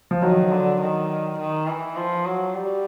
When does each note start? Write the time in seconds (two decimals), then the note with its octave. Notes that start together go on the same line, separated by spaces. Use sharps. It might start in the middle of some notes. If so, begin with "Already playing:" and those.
0.11 F3
0.22 D#3 F#3
0.51 D3
0.81 D#3
1.39 D#3
1.68 E3
1.97 F3
2.26 F#3
2.55 G3